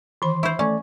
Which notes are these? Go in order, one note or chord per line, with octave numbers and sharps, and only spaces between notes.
D#3 E3 B5 C6
E4 C5 C#6
A3 C#4 D5